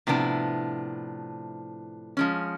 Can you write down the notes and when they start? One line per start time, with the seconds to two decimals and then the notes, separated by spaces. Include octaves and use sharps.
0.07 A2 C3 F3 B3 D4 E4
2.17 F3 G#3 C#4